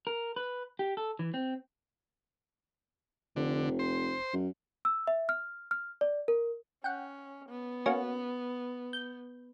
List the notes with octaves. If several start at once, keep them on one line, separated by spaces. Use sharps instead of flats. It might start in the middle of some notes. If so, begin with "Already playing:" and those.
A#4
B4
G4
A4
E3
C4
F1 D3
C5
F#2
E6
E5
F6
F6
D5
A#4
C#4 F#5 G5
B3
A#3 C#4 F#4
G6